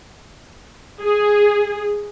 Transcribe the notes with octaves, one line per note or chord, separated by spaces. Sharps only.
G#4